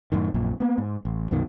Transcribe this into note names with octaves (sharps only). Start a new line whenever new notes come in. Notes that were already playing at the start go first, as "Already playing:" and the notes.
F#2 A2 D#3
A#1 F#2 A#2
A#3 B3
G#2
A1
C2 F#2 B2 D#3